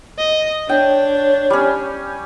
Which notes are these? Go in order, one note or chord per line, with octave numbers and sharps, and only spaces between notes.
D#5
D4 C#5 G5
G3 C#4